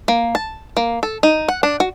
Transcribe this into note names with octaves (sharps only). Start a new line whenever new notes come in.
A#3
A5
A#3
A4
D#4
F#5
D4
F#4